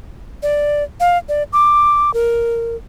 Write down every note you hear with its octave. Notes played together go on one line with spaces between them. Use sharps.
D5
F5
D5
D6
A#4